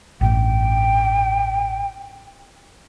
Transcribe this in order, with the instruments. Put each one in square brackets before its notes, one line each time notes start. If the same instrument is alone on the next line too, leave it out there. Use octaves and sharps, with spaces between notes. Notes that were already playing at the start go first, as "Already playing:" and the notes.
[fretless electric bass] A1 G2 [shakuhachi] G5